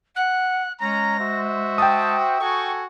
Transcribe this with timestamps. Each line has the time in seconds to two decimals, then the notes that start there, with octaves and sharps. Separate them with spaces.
0.16 F#5 F#6
0.80 G#3 C#4 A#5 A#6
1.18 F#4 C5 E5
1.78 G5 A5 D#6
2.40 F#4 A4 G#5 C#6